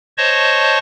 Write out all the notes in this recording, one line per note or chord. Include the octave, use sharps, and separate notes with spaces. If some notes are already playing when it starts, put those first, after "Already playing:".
C5 C#5 D#5 A5 C#6